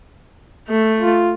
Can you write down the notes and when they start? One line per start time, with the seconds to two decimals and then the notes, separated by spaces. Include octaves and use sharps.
0.69 A3
0.98 F4